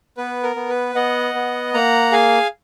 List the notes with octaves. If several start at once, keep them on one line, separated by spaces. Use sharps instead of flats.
B3 B4
A#4
B3
B4
B3 D#5 F#5
B3
A#3 F#5 A#5
G#4 F5 G#5